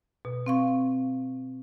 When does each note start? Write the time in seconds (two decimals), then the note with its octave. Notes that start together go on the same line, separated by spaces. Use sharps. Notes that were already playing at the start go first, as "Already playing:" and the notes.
0.25 B2
0.46 C4 F5 C#6